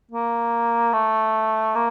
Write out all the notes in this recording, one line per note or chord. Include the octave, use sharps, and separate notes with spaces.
A#3
A3
A#3